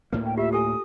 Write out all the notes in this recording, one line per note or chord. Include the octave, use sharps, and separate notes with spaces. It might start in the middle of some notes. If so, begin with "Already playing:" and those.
D2 A2 A#3 B4
G5
F4 G4 E5
G4 A4 G#5 D#6